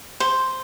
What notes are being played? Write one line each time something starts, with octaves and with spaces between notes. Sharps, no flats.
C5